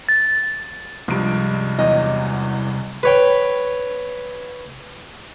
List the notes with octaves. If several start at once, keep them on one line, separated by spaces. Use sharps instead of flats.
A6
C#2 G2 C3 F3 D7
E2 F#3 D#5
B4 C#5 G5